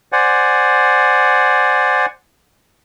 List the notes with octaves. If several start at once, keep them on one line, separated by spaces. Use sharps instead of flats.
C5 D5 F#5 G#5